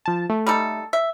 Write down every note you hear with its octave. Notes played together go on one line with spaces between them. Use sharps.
F3 A5
A3
G3 D#4 A4
E5